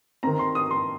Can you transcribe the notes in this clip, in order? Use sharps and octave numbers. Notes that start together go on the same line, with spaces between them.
D#3 C4 A#5
C6
D#6
C6